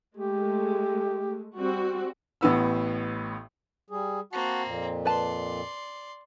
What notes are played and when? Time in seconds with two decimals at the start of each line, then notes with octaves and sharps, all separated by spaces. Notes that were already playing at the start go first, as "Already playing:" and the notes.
0.17 G#3 A3 G4
1.58 G3 C4 F#4
2.41 A1 A2 B3 E6
3.90 G3 G#4
4.33 A#3 C4 F#4 F#5 A5
4.65 F2 A#2
5.06 B4 D5 A5 C6